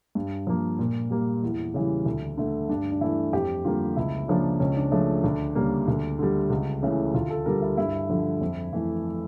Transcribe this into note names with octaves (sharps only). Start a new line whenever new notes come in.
G2
F3 A#3
A#2
G3 A#3
E2
C#3 E3 G3
D2
D3 A3
G2 D4
D4
E3 A3 E4
F2 G4
D3 G3 A#3 F4
C#2 E4
C#3 F3 A#3 D4
C#2 C#4
D4
C#3 F3 A3 D4
D2 D4
C#3 G3 A#3
D2
D3 G3
C#2
C#3 E3 A3
D2 F4
A4
D3 G3 A#4
E4
G2 E4
D3 F3
F2
E3 A3